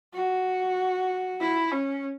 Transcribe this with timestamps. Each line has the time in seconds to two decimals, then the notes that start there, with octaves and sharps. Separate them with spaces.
0.14 F#4
1.41 E4
1.72 C#4